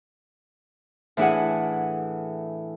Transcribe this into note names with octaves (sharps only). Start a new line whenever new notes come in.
A2 E3 D4 E4 G#4 F#5